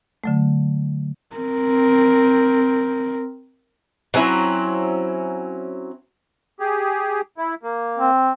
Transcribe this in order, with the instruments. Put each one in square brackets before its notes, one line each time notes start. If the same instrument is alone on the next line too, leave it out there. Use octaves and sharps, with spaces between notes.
[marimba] D3 F#3 A3
[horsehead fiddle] C4 A#4
[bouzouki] F#3 C4 C#4 E4
[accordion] G4 G#4
E4
A#3
[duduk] C4